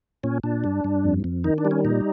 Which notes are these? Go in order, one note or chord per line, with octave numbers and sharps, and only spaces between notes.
A#2 C#4
A#2 D4
G2
G2
F2
F2
D#3 D#4
D4
G3
C#4
A#2 D#4